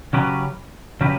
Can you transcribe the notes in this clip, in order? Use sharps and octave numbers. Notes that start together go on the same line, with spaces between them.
C#3 F#3 C#4 G4 B4
C#3 F#3 C#4 G4 B4